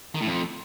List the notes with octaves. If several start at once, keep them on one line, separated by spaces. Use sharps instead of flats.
D#3
A2
F2